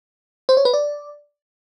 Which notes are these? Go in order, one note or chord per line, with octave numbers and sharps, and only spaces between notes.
C5
C#5
B4
D5